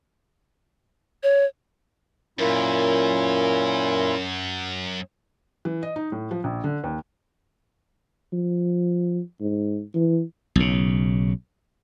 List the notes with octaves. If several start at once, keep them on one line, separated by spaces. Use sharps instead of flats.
C#5
F#2 A#2 C#4 E4 F4 A#4
E3
D#5
D#4
A2
F3
A#1
D3
D#2
F3
G#2
E3
B1 C#3